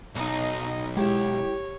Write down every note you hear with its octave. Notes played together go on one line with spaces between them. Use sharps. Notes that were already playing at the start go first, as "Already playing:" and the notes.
B1 D#4 D#5
G#3 E4 G4 C#5